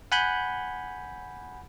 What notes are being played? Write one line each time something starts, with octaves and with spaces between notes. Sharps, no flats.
F#5 G#5 B5 F#6 G6